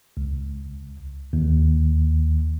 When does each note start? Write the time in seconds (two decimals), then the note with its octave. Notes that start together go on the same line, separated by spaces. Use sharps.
0.17 C#2
1.33 D#2